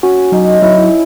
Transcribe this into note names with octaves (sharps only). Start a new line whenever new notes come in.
C#4 F#4
F#3 D#4
F#3 E4